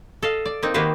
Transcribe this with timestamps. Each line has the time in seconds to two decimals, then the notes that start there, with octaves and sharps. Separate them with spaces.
0.23 A4 D#5 F5
0.46 D5
0.63 A#3 C4 D#4
0.74 D#3 A#3 F#4 G4 B4 C5